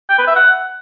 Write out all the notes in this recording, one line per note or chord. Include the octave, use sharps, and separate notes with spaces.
G5
B4
E5
F#5